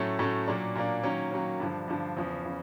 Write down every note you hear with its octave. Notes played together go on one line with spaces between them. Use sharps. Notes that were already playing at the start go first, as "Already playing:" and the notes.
Already playing: A2 F#3 A3 C#4
A2 F#3 A3 C#4
A#2 F#3 A#3 D4
A#2 F#3 A#3 D4
D#3 F#3 A#3 C#4
D#3 F#3 A#3 C#4
G2 D3 F3
G2 D3 F3
E2 C#3 F3
C#3 F3